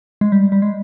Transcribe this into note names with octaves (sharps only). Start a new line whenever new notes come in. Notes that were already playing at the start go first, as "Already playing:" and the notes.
G#3
G3
G3
G#3